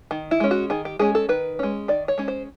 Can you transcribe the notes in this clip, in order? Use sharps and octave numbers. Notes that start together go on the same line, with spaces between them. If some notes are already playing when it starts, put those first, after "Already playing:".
D#3
E4
G#3 C#4
F#4
D#3 G#4
G4
G#3 C#4 G#4
A4
D#3 B4
G#3 C#4
D#3 D5
C#5
G#3 C#4
C5